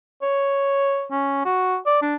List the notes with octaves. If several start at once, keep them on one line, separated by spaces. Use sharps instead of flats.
C#5
C#4
F#4
D5
D4